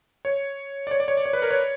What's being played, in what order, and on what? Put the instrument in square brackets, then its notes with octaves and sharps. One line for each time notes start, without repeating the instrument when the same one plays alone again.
[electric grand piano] C#5
D5
C#5
D5
C#5
D5
C#5
B4
A#4
C#5